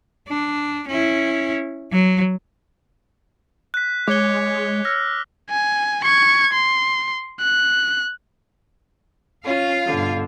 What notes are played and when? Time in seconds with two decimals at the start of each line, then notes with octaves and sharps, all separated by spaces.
0.28 D4
0.88 C#4 E4
1.92 F#3
3.74 F#6 B6
4.08 G#3 C#5 D6 G7
4.85 E6 F6 A#6
5.50 G#5
6.04 C#6 G#6
6.53 C6
7.40 F#6
9.45 C#4 F4 F5
9.86 G2 B2 D3